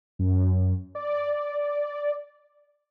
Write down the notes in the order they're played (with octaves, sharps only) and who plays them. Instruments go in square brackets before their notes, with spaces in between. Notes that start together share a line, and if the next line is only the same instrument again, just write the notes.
[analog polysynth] F#2
D5